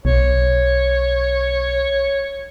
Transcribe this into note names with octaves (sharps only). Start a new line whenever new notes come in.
B1 C#5